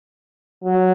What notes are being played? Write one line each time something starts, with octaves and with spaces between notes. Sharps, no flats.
F#3